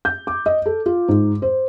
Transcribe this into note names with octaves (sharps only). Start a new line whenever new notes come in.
G6
D6
D#5
A4
F4
G#2
C5